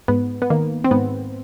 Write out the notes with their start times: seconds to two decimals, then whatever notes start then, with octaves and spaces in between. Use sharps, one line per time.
0.08 G#2 B3
0.42 B3
0.50 D#3 A#3
0.84 C4
0.91 G#2 B3